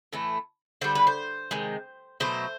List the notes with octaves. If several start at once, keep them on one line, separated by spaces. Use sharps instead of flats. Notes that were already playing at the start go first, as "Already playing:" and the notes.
A2 E3 A3
D3 G3 C5
B4
C5
C3 D#3 G#3
B2 F#3 A3 C5